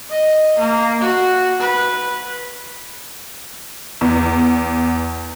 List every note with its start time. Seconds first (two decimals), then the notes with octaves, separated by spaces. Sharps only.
0.10 D#5
0.59 A#3
1.01 F#4
1.60 B4
4.01 E2